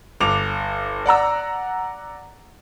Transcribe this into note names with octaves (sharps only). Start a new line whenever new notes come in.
G1 D6 F7
D5 F#5 A#5 E6